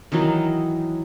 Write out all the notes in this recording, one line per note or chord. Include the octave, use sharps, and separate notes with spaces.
D#3 E3 F#3 D#4